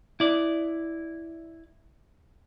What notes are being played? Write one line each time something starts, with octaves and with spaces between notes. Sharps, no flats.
E4 D5